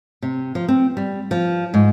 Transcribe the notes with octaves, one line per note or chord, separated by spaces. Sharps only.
C3
F3
C4
G3
F3
G#2